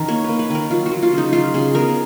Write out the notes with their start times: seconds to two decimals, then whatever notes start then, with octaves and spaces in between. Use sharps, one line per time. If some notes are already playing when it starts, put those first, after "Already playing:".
Already playing: D#3 C#4 A#4
0.08 A#3 C#5
0.24 A#3 B4
0.39 B4
0.50 D#3 A#4
0.71 F#3 F4
0.86 F#4
0.91 F#3
1.03 F4
1.12 C#3
1.18 D#4
1.33 F#3 F4
1.54 C#3 G#4
1.75 B3 A#4